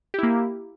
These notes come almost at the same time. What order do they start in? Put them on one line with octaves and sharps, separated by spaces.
G4 E4 A#3